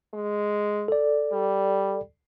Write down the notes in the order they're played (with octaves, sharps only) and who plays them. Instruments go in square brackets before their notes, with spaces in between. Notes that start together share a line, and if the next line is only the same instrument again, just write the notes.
[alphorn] G#3
[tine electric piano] A4 D5
[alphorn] G3